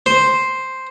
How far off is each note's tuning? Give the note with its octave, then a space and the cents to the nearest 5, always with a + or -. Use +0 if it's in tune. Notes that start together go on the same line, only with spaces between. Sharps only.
C5 +0